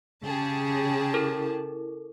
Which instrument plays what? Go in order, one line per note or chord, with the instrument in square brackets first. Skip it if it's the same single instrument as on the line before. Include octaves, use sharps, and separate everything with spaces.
[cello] C#3 [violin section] G4 G#4 A5
[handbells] E4 A4 A#4